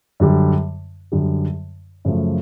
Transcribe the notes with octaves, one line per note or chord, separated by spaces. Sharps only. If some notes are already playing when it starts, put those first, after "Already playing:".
F#2 D3 G3
F#2 D3 G3
F#2 C#3 F3 A3